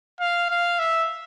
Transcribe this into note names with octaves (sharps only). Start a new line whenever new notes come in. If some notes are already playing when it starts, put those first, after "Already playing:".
F5
F5
E5